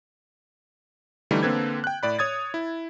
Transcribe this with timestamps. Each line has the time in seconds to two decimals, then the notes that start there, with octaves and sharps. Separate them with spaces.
1.31 D3 E3 G3 A3 D#4
1.43 D3 A#3 C4 A4 B4 G#6
1.84 G5 F#6
2.03 A2 D5 B5
2.19 C#5 D#6 G#6 A6
2.54 E4